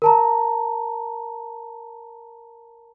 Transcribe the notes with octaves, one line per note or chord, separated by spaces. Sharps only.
A#4 A5 A#5